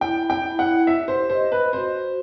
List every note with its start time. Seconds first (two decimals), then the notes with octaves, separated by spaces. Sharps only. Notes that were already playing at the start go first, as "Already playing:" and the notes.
0.01 E4 G5
0.30 G5
0.44 E4
0.59 F#5
0.87 G4 E5
1.08 C5
1.30 C5 D#5
1.52 B4
1.73 F#4 C5